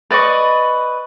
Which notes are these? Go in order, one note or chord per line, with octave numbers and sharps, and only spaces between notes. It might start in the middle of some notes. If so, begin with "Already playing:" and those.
B4 D5 D#5 C#6